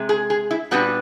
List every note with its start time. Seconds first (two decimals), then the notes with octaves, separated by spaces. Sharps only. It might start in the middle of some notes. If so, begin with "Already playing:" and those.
Already playing: C3 G#3
0.09 G#4
0.30 G#4
0.51 E4
0.71 A#2 G3 B3 D4 F#4